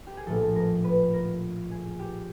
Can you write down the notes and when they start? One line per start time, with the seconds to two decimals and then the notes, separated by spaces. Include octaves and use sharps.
0.07 G4
0.17 G#4
0.26 A#1 A2 F3 A4
0.56 A#4
0.84 B4
1.13 A#4
1.71 G#4
1.99 G4